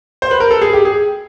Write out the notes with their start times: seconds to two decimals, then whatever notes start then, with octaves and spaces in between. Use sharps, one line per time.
0.22 C5
0.31 B4
0.40 A#4
0.51 A4
0.62 G#4
0.73 G4
0.85 G#4